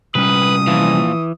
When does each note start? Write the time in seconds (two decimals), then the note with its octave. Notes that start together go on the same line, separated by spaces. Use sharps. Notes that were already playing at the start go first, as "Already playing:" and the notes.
0.15 C3 G3 C#4 B4 D#6
0.67 A#2 E3 F3